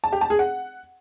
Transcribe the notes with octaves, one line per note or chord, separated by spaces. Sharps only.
A5
G4
A5
G#4
F#5